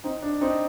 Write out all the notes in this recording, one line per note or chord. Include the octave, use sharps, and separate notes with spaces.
C4 D#4
D4
C4 D#4